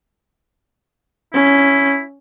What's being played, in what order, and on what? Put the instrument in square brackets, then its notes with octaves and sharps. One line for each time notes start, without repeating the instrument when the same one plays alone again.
[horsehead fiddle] C#4 [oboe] E4